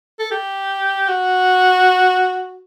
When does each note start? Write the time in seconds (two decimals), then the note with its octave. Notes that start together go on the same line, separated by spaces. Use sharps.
0.19 A4
0.31 G4
1.08 F#4